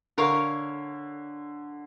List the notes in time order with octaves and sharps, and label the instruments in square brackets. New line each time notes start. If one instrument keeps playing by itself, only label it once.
[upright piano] D3 [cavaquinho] A#4 C#5 F5